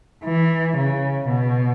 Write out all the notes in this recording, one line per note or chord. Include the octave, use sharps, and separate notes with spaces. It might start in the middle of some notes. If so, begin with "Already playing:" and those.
E3
C#3
B2